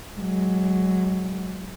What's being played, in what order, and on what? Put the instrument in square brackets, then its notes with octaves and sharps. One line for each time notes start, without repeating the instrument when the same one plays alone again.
[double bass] F#3 G#3